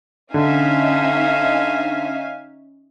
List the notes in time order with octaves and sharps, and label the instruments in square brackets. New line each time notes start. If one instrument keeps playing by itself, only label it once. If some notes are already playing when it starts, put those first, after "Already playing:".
[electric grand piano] D3 [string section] C#4 D#4 E5 [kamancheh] F5 G#5